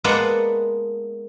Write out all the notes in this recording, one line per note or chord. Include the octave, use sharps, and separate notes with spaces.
G#3 A#3 B3 A4 D5 F#5